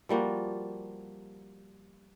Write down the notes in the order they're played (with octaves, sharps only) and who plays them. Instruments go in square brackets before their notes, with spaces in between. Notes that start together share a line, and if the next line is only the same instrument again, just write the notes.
[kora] F3 G3 A#3 F#4